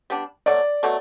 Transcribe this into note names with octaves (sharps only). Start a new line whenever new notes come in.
G3 B3 D4
B2 F#3 A3 D5
B2 F#3 A3